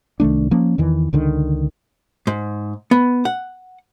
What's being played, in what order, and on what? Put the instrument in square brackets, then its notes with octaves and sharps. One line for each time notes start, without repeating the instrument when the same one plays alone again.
[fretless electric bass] C2 D#3 A3 D4
F3 A#3 C#4
E2 D#3 E3
C#2 D3 D#3
[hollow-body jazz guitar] G#2
B3
F#5